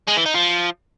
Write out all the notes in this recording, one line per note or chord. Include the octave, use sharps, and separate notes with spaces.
G#3
E3
D#4
F3